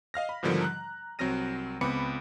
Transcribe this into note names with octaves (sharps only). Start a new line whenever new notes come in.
D#5 F5 F6 A#6
B5
G#2 B2 D3 D#3 F3 G3
A#5 F#6
C2 F#3 C4 F6 A#6 D#7
C#2 B3 C4 B5 D6 C#7